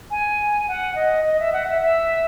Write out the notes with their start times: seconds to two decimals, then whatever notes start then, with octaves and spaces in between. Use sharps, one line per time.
0.11 G#5
0.68 F#5
0.96 D#5
1.24 D#5
1.39 E5
1.53 F#5
1.67 E5
1.82 E5